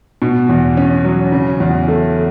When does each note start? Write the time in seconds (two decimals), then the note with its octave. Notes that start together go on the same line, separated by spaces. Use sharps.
0.22 B2
0.49 E2
0.77 C#4
1.05 F#3
1.32 C#3
1.60 E2
1.88 A3